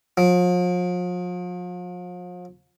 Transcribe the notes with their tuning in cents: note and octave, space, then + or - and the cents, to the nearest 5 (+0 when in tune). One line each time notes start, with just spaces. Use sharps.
F3 +40